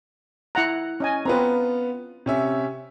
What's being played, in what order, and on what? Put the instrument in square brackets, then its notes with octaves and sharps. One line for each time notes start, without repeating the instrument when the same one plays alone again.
[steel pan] E4 F#5 A#5 [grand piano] F#6
[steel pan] C#4 D#5 G#5
[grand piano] B3 F4 A#5 [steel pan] C4 B4
[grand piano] C3 C#4 E5